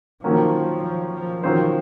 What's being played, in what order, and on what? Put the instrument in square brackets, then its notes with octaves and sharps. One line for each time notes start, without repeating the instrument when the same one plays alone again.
[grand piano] D#3 F#3 A#3 C#4 [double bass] F3
[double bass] F3
F3
[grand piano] D#3 F#3 C#4 F4 C5 [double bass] F3